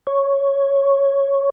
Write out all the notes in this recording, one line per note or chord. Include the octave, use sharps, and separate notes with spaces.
C#5